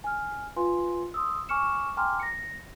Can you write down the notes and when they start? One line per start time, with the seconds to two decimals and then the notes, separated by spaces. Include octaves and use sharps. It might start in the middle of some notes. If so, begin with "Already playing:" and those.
0.04 G#5 F6
0.56 F4 B4 F5 G#5 C6
1.14 C6 D#6 E6
1.49 G#5 C#6 D6 F6 C#7 E7
1.97 G5 G#5 A#5 C6 D6 F6
2.20 A#6 C#7